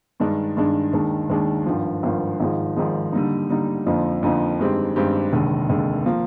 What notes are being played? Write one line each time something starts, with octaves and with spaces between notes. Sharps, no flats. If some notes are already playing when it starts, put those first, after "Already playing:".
G2 D#3 G#3 D4
G2 D#3 G#3 D4
D#2 D#3 G#3 D4
D#2 D#3 G#3 D4
G#1 G2 F3
G#1 G2 F3
G#1 G#2 F3 G#3
G#1 G#2 F3 G#3
D3 G3 A#3 D#4
D3 G3 A#3 D#4
F2 D3 F3 A#3 D#4
F2 D3 F3 A#3 D#4
G2 D#3 G#3 C4 G4
G2 D#3 G#3 C4 G4
F1 D#2 D3 G#3
F1 D#2 D3 G#3
F3 A#3